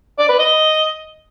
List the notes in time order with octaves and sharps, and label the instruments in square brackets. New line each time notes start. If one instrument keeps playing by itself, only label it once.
[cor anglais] D5
B4
D#5